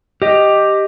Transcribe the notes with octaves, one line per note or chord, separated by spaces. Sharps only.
G4 D#5